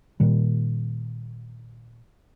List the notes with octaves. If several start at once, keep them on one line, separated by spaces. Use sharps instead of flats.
A#2 D#3 G3